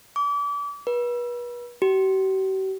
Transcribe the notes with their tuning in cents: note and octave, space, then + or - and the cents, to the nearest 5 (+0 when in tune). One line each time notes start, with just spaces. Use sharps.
D6 -35
B4 -35
G4 -45